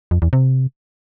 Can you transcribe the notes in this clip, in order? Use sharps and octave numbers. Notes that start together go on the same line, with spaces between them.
F2
E2
C3